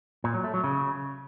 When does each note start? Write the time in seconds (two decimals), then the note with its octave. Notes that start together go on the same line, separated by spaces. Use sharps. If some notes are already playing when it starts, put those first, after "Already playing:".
0.24 A#2
0.34 F#3
0.44 A3
0.54 F#3
0.64 C#3